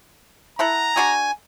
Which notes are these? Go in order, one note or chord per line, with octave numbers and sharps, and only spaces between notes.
E4 A4 F#5 A#5
D4 F#4 G#4 G#5